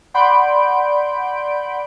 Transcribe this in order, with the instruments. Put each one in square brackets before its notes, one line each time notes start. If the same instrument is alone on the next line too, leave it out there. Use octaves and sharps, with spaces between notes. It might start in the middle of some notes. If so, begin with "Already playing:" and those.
[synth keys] D5 F#5 B5 C6 G6 D7